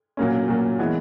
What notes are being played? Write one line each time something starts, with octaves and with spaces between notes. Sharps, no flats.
A#2 F#3 A#3 C#4
A#2 F#3 A#3 C#4
E3 G#3 B3